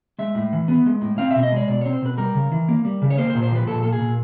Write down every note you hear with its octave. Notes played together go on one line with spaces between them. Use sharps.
G#3 E5
A2
E3
B3
G#3
A2
C4 F5
B2 E5
D#5
G#3 D5
B2 D5
C4 C#5
C5
B2 B4
G3 A#4
C#3
E3
A#3
G3
C#3
C#5
A#3 C5
C5
A#2
C5
F3 B4
A#2 A4
A#3 A4
G#4
A#2